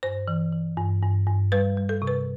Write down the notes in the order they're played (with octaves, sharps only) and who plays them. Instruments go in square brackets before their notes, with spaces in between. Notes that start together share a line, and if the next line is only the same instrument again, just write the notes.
[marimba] G2 C5
E3
E3
G2
G2
G2
G3 B4
G3
A4
C3
B4